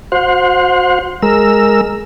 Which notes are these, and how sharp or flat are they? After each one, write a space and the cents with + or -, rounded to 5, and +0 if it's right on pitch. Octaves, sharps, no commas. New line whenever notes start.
F#4 -20 C5 +0 F5 +45
G#3 +0 A#4 -5 E6 +0